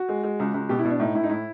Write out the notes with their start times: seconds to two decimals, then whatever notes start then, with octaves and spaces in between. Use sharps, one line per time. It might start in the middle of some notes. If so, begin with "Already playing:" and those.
Already playing: F#4
0.09 G#3
0.24 G#3
0.40 C#2
0.54 C#2
0.69 B2 G4
0.79 E4
0.85 B2
0.90 D4
1.00 A2 D#4
1.15 A2 E4
1.23 D#4
1.30 A2 E4